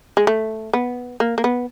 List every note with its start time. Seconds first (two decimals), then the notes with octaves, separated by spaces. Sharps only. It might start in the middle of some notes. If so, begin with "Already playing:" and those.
0.17 G#3
0.27 A3
0.73 B3
1.20 A#3
1.38 A#3
1.44 B3